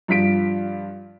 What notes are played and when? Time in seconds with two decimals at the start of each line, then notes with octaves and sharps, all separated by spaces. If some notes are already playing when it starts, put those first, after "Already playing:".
0.08 G2 F3 F4 B6 D7